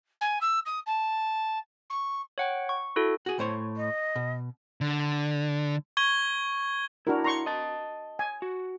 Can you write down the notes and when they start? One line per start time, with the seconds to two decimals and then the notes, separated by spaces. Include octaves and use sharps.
0.21 G#5
0.41 E6
0.65 D#6
0.86 A5
1.90 C#6
2.38 C#5 F#5 G5
2.69 C#6
2.96 E4 F#4 A4
3.26 F#4 G#4
3.39 A2 C5 C#5
3.77 D#5
4.16 B2
4.81 D3
5.97 C#6 G#6 G7
7.07 D4 E4 F#4 A#4
7.24 A#5 C6 C#6
7.46 D#5 A5
8.19 G#5
8.42 F#4